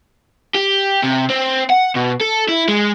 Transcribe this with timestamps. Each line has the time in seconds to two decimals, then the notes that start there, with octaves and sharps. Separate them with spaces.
0.55 G4
1.03 C3
1.30 C4
1.70 F#5
1.95 B2
2.21 A4
2.48 E4
2.68 G#3